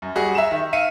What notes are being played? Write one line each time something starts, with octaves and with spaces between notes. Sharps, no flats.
F#2
G3 F#4 G#4
E5 A#5 E7
D#3
E5 F5 C#7 D#7